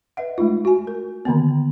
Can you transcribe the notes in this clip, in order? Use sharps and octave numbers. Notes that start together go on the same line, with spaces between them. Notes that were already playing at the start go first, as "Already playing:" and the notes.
B4 D#5 E5 F#5
G#3 A3 D#4 F4
F#4 G#5
A#4
D3 D#3 A#3 B3